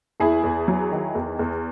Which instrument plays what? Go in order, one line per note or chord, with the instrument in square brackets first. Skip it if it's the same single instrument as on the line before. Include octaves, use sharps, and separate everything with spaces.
[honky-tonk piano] E2 E4 G#4
E2
F#3
D#3
E2
E2